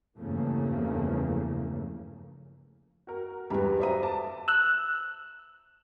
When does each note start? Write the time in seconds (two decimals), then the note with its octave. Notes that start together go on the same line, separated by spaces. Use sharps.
0.18 E2 G2 C#3 F3 A3 A#3
3.07 F#4 A#4
3.50 E2 G2 G#3 G4 B4
3.80 F#4 C5 E5 A#5 D#6 D#7
4.03 A5 D6
4.48 E6 F#6